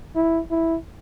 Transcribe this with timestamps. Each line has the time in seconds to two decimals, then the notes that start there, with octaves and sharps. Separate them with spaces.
0.15 E4
0.51 E4